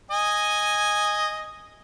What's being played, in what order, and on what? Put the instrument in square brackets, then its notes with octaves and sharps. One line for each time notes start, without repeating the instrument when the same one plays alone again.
[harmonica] D#5 G#5